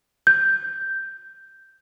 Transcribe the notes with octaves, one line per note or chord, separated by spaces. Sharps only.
G6